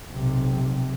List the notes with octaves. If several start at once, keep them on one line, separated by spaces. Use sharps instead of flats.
B1 C3